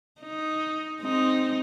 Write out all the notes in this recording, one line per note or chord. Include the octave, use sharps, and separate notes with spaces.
D#4
G#3 C4 D#4